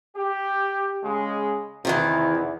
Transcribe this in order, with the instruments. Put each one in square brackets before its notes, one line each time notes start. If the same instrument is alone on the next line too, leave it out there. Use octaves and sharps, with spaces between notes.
[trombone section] G4
C#3 G#3
[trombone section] E2 [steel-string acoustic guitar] C3 D#3 E3